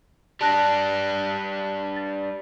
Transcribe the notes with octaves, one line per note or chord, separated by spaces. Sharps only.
G3 D4 A5 F#6 A#6
A6